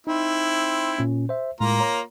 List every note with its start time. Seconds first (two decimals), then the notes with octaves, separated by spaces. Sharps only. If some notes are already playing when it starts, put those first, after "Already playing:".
0.07 C4 D#4 E4
0.99 A#2 C#4
1.29 C5 E5
1.61 A2 G#3 A#3 F4 A#5
1.80 C#5